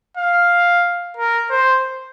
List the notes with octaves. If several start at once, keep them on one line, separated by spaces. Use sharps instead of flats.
F5
A#4
C5